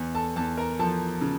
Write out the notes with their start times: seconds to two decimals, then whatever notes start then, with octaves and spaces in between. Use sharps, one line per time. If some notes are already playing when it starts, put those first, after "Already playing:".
Already playing: E2
0.15 A4 A5
0.36 E2 A4 A5
0.57 A#4 A#5
0.79 F3 A4 A5
1.21 C#3